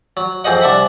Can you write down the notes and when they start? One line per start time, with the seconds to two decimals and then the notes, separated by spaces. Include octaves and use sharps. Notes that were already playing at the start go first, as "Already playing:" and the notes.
0.17 F#3
0.44 F2 C4 G#4 C5 D#5 F#5
0.61 C2 D4 E5 F#5 B5